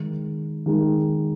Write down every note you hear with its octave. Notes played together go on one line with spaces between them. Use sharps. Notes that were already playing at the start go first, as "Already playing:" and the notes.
Already playing: D#3 G#3 D#4
D#3 G#3 D#4